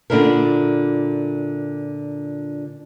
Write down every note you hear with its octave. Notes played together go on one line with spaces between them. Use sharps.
A#2 D3 D4 E4 A#4